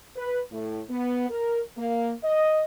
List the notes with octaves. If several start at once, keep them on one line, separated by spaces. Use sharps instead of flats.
B4
A2
B3
A#4
A#3
D#5